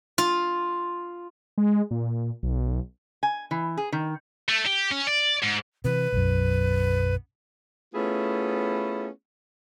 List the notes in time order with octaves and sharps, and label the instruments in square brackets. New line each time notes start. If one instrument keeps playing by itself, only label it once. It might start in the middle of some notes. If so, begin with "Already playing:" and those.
[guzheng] F4
[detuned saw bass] G#3
A#2
B1
[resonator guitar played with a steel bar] G#5
E3
G#4
D#3
[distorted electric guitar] A3
G4
C#4
D5
G#2
[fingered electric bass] C3 E3 [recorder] B4
[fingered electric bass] B1 F#2
[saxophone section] A3 B3 C#4 E4 F4 G#4